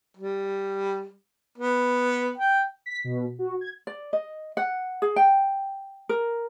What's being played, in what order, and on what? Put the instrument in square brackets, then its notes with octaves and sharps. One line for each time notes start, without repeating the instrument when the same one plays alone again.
[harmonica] G3
B3
G5
[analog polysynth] B6
B2
F#4
G#6
[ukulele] D5
D#5
F#5
G#4
G5
A#4